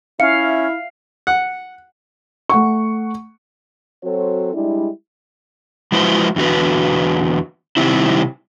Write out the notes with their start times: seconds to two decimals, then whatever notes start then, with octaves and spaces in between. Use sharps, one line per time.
0.20 C#4 E4 E5 F5 C#7
1.27 F#5
2.49 A3 F#5 C#6
4.04 F#3 C4 F#4 A4 C5 C#5
4.54 G3 G#3 D4 E4
5.92 F3 G#3 E4 F#4 B4 C5
6.36 E2 D3 F#4 B4
7.77 C3 D#3 G3 C4 E4